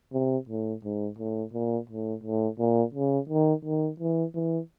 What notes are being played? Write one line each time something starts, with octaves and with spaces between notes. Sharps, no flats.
C3
A2
G#2
A2
A#2
A2
A2
A#2
C#3
D#3
D#3
E3
E3